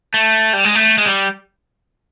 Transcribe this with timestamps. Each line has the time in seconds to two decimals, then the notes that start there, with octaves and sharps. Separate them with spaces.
0.14 A3
0.53 G3
0.65 G#3
0.75 A3
0.98 G#3
1.06 G3